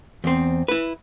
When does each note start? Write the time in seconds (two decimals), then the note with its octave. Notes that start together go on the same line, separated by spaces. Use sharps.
0.24 E2 C4
0.68 E4 B4